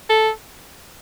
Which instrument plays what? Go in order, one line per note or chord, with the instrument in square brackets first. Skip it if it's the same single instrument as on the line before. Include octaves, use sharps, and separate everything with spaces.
[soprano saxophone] A4